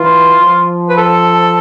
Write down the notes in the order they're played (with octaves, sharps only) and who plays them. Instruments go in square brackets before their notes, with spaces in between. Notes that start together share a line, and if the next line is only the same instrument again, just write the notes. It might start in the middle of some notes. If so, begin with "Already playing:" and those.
Already playing: [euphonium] E3 [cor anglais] F4
[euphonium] F3
[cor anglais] B4
A4